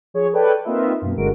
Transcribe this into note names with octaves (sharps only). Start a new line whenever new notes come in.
F3 G#4 C#5
A4 B4 C#5 D5 G5
A#3 C4 D#4 F4 B4 E5
F#2 B2 A#3
G1 D3 G#3 F#4 A#4 D7